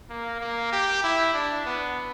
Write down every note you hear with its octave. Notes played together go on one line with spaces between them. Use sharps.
A#3
A#3
G4
E4
D4
B3